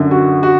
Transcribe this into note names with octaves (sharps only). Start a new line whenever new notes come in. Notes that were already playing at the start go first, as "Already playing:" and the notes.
Already playing: F#2 D3
F#4
F#4